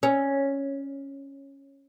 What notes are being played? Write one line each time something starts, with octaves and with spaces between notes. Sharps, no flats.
C#4